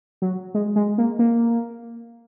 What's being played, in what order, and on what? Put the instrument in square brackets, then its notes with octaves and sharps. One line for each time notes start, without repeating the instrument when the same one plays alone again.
[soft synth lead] F#3
G#3
G#3
A#3
A#3